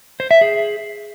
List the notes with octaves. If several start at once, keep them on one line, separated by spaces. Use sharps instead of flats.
C5
E5
G#4